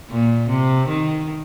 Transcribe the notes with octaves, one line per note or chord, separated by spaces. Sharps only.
A#2
C3
D#3